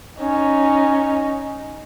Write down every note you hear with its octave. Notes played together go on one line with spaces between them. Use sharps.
C#4 D#4